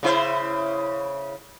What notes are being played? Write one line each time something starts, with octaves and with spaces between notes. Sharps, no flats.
C#3 E4 C5